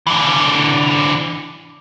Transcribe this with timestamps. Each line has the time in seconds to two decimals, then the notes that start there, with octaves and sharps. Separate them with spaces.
0.07 D3 E3